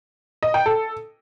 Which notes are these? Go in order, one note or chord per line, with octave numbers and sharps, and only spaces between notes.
D#5
G5
A4